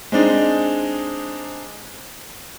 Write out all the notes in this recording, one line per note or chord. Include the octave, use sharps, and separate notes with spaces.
G#3 C4 D4 D#4